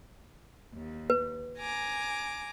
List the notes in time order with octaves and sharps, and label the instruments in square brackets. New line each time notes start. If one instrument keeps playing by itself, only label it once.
[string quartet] D#2
[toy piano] B4
[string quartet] G#5 A#5 D6